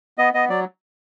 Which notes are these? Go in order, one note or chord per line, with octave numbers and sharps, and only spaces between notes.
B3 D#5
B3 D#5
F#3 D5